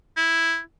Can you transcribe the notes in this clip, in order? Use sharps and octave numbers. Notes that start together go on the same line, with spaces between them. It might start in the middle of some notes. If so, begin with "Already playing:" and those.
E4